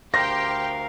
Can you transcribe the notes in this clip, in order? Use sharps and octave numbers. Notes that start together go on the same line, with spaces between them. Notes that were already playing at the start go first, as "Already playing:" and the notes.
D2 G4 A#4 C5 F5 G5 A#6